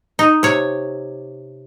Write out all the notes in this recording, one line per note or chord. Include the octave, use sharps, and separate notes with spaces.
D#4
C3 C#5